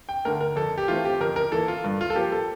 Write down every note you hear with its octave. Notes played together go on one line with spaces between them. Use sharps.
G5
D3 A3 A#4
A#4
F2 A4
G4
E3 A3 C4 F4
G4
F2 A#4
A#4
E3 A#3 A4
F4
G2
F4
A4
F3 A#3 G4
A4